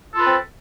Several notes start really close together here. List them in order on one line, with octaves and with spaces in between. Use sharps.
A4 F4 B4 C4